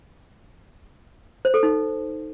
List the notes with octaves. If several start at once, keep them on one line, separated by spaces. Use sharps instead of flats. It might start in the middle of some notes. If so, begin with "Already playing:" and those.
C5
A4
D#4